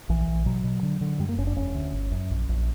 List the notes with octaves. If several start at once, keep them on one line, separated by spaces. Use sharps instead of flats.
A#1 E3
A#1
B2 F#3
B2
D3
D3
F#2 G3
A#3
F#1 C#4
D4
E1 C#4
D2
G1
F#2
A#1
A#1